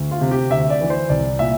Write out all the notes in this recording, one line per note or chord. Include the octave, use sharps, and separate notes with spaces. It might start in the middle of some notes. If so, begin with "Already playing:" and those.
Already playing: D2
F4
C3
G4
D2 E5
D5
E3
C5
C2 D5
A#2 E5